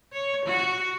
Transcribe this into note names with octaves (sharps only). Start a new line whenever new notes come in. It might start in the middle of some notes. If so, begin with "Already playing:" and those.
C#5
F#4